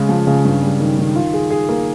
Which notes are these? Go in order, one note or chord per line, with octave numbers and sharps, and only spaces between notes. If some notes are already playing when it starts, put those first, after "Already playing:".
Already playing: C#3 G#3
F3
C#3
G2
G3
D#3
D#3
F4
G#4
G#4
A#3